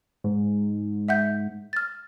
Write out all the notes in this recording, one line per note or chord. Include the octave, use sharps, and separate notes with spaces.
G#2
E5 F#5 G6
F6 A6